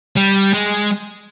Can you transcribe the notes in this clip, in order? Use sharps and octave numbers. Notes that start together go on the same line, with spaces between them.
G3
G#3